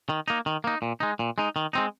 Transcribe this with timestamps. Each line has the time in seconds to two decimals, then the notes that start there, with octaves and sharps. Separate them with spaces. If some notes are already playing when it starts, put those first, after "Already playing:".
0.09 D#3
0.28 A#3 D#4
0.46 D#3
0.64 A#3 D#4
0.82 A#2
1.00 G#3 D#4
1.19 A#2
1.38 G#3 D#4
1.56 D#3
1.73 G#3 C4 D#4